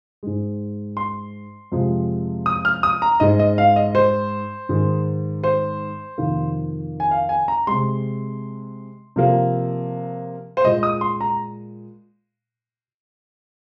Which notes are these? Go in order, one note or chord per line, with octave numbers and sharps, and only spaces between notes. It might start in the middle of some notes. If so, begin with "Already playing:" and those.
G#2 G#3
C6
F2 C3 F3 G#3
D#6
F6
D#6
A#5
G#2 G#3 D#5
D#5
F5
D#5
C5
G#2 D#3 G#3
C5
F2 C3 D#3 A#3
G#5
F5
G#5
A#5
C3 G#3 C6
C3 F3 A#3
C5
A#2 G#3 D#5
D#6
C6
A#5